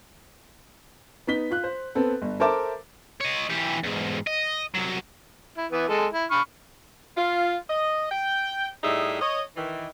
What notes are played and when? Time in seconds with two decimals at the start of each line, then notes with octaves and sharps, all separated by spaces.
1.27 B3 D#4 B6 G7
1.50 F4 F#6
1.64 C5
1.95 B3 C4 A4
2.22 G1
2.40 A4 A#4 C5 E5 A5 D6
3.21 C#5 D#5
3.50 E3 G4
3.83 E2 G#2
4.27 D#5
4.75 C2 F#3
5.58 E4
5.72 E3 B3 E5
5.88 G#3 A4
6.13 E4
6.31 B5 C#6 F6
7.17 F4
7.70 D#5
8.12 G5
8.84 A2 G3 D#4 G#4 E5
9.21 C#5 D#5
9.57 D#3 E3